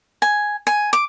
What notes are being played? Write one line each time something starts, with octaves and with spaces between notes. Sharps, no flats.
G#5
G#5
D6